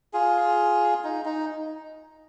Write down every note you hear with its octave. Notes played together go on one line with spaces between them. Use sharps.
F4 G#4
D#4
D#4